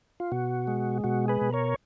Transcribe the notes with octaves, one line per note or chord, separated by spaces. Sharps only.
F4
B2 F#4
G#3
B2 F#4
G#4 B4
B2
A#4 C#5